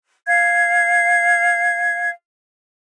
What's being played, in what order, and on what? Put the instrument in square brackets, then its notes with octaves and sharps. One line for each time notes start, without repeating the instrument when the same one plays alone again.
[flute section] F5 G#6